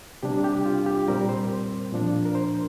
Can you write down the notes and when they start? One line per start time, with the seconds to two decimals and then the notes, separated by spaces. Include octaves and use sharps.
0.23 C3 G3 D4 G4
0.44 G4
0.66 F4
0.86 G4
1.08 A#2 G3 C4 A#4
1.29 C5
1.92 A#2 F3 D4
2.25 A#4
2.35 C5